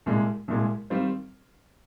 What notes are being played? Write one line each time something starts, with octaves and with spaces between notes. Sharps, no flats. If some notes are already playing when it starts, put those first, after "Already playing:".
C2 A#2 G#3
C2 A#2 G#3
D#3 G3 C4 F4 C5